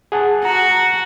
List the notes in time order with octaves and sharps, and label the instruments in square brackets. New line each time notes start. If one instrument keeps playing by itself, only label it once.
[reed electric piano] G#4 F#5 A5
[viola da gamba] F#4 [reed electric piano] A#5